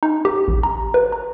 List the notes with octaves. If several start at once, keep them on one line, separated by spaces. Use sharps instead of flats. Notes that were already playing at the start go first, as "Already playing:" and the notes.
D#4
G4
A1
A#5
B4
A#5